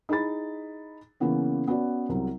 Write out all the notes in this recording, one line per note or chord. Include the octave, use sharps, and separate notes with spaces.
D#4 E4 G#4 B5 A6
C#3 E3 A#3 B3 C#4
B3 C#4 F#4 D5
C2 C3 F#3